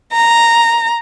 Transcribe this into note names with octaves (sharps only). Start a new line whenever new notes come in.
A#5